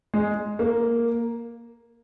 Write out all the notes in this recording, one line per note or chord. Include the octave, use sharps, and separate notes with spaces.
G#3
A#3